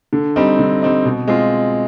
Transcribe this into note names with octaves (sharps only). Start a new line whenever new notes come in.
D3
G3 C4 D#4
D3
G3 C4 D#4
B2
G#3 C4 F4